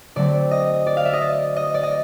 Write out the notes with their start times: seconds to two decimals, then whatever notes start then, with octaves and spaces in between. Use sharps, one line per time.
0.16 D3 F#3 A3 C4 D5
0.51 D#5
0.86 D5
0.97 F5
1.05 E5
1.13 D#5
1.21 D5
1.56 D#5
1.74 D5
1.83 D#5